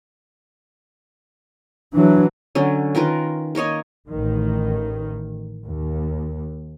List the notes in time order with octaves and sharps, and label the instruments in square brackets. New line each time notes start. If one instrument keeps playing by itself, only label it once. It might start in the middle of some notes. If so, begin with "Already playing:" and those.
[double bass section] E3 F#3 [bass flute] D4
[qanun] D3 F#3 C#4
D#3 F4 A#4 B4
A#3 A#4 C#5 D#5
[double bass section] A1 D#3
D#2